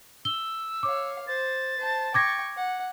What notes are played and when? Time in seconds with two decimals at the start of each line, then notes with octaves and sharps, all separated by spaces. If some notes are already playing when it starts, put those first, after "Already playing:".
0.25 E6 G7
0.83 C#5 F5 D6
1.27 C5 A6
1.78 C5 A5
2.14 G5 C#6 D6 G#6 A#6
2.57 F#5